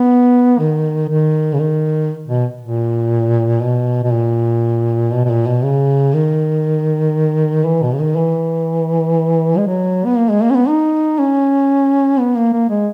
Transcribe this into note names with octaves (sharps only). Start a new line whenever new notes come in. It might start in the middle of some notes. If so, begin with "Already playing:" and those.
Already playing: B3
D#3
D#3
C#3
D#3
B2
A#2
B2
B2
A#2
B2
B2
A#2
B2
C#3
D#3
E3
B2
C#3
D#3
E3
G#3
F#3
B3
A#3
G#3
A#3
C#4
B3
D#4
C#4
B3
A#3
A#3
G#3